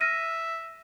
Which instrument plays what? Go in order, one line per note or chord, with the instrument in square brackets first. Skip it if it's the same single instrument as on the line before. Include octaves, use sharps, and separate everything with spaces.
[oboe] E5 [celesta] F6 A#6 D#7